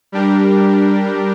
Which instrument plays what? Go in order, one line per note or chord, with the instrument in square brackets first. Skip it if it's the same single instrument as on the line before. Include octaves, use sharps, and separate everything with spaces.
[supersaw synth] G3 D4 G4 A#4